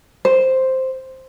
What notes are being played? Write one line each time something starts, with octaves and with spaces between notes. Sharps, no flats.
C5